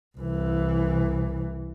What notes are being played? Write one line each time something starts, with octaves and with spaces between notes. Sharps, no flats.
C2 E3